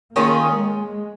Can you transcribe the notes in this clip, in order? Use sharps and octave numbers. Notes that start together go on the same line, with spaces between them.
D#3 A#3 C#4 F4 G#4
G#3